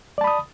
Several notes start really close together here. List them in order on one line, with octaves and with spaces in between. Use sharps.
D5 A5 B5 D#6